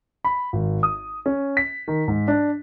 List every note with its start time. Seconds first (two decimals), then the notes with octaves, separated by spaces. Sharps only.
0.25 B5
0.53 G#1
0.83 D#6
1.26 C#4
1.57 B6
1.88 D#3
2.08 G#2
2.28 D4